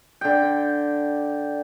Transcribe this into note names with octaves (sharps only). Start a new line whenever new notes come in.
D3 G5